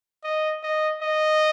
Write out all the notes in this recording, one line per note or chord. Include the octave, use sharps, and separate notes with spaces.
D#5
D#5
D#5